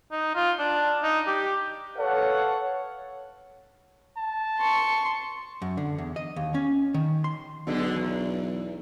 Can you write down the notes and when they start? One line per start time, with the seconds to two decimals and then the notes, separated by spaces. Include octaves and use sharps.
0.11 D#4
0.35 F4
0.59 D4
1.03 D#4
1.27 G4
1.97 A4 B4 C#5 F5 F#5
4.17 A5
4.59 C6 C#6
5.62 F#2
5.77 D3
5.98 E2
6.16 D#5
6.36 D#2
6.55 C#4
6.94 D#3
7.24 C6
7.67 B1 B2 D3 G#3
7.96 E2